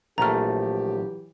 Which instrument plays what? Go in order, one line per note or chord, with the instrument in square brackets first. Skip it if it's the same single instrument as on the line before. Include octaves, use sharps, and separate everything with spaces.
[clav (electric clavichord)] A#1 A3 [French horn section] E3 F#3 G4 [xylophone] A#5 F6